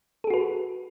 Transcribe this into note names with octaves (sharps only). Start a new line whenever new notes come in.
F#4 G#4 A4 B4